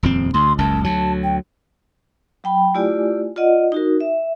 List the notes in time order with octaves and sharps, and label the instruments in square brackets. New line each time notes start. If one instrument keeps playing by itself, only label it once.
[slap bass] D#1 F2 C4
[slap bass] D2 [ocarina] C6
[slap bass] F#1 C#2 F#2 [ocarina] A5
[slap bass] D2 F#3 [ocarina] A5
[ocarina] G5
[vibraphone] F#3 G5 B5
A3 E4 F4 G4 D5 G#5
F4 D5 D#5 F#5
D#4 F#4 A#4
E5